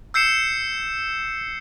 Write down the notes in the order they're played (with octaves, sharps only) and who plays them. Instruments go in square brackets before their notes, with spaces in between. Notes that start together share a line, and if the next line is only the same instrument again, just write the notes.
[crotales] E6 G6 C7 C#7 E7